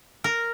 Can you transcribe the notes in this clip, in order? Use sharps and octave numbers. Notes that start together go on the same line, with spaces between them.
A#4